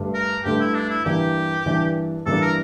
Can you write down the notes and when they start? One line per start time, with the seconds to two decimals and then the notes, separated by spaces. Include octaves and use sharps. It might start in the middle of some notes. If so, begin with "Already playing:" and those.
Already playing: G2 D3 A3
0.14 A#4
0.44 G2 D3 A3 G4
0.60 E4
0.74 D4
0.90 E4
1.05 G2 E3 A#3 D4 G4
1.66 G2 E3 A#3 D4
2.26 G2 E3 A#3 D4 A4
2.42 A#4